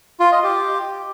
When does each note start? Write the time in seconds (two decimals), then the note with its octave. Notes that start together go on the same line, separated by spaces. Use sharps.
0.20 F4
0.32 D#5
0.44 G4